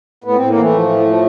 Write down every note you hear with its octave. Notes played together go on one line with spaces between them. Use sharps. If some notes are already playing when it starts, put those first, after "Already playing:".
A2 B3
A2 C4
A#3
E3 A3
F3
A2
F3